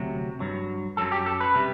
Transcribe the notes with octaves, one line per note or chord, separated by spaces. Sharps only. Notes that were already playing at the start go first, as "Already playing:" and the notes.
Already playing: D2 C3 F#3
G2 F#3
F#2 F#3 A4
G4
A4
B4
C3 G3